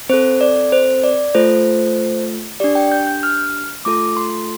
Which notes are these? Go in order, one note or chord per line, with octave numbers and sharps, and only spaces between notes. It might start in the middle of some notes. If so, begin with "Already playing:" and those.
C4 A4 C5
D5
C5
D5
A3 F4 A4 C5
D4 G4 D5
G5
G6
G6
F6
A3 F4 A4 D6
C6